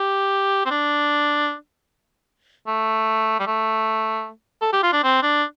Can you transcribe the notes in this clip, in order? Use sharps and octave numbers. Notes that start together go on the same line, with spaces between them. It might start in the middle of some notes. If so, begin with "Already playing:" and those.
Already playing: G4
C4
D4
A3
G3
A3
A4
G4
F4
D4
C4
D4